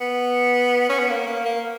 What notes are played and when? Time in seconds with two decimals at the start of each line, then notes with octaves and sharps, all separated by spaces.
0.01 B3
0.89 C#4
0.99 B3
1.09 A#3
1.27 A#3
1.45 A#3